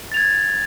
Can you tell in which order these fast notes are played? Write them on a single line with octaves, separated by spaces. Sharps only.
A6 F7 G#6